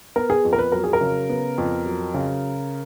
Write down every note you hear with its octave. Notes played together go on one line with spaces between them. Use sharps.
B3 A#4
G#4
F2
A#4
B4
F#3 A#4
G#4
A#4
C#3
B3
F2
F#3
C#3